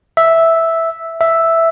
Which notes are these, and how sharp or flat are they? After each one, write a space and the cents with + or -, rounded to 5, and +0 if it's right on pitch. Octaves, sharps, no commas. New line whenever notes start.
E5 -5
E5 +0